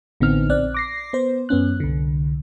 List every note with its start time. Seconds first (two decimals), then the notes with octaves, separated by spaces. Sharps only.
0.20 A1 D3 B3 C4 D#4 F6
0.49 A#1 C4 D5 F#6
0.74 D6 A#6 C7
1.13 B3 C5
1.49 F#2 B3 C#4 F#6
1.80 C2 D3